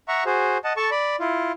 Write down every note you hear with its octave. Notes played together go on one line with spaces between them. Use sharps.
E5 F#5 A#5 C#6
F#4 G#4 C5
D#5 F#5 A5
A4 A5 C#6
D5 B5
E4 F4